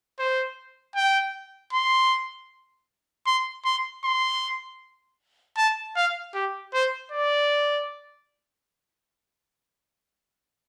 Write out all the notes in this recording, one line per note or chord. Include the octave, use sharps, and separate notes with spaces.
C5
G5
C6
C6
C6
C6
A5
F5
G4
C5
D5